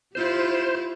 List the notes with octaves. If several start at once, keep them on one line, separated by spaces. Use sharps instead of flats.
E4 F4 G4 C5